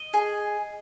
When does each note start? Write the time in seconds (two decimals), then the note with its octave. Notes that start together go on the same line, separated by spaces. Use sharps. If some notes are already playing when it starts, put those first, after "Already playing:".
Already playing: D#5
0.14 G#4